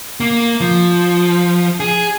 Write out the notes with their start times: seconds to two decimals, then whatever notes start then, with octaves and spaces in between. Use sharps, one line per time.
0.20 A#3
0.61 F3
1.80 G#4